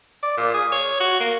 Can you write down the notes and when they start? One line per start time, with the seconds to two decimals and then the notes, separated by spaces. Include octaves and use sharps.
0.23 D5
0.37 A#2
0.54 G#4
0.72 C#5
1.00 F#4
1.20 A#3